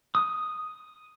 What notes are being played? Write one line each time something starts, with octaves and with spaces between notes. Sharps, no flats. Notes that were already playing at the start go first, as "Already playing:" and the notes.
D#6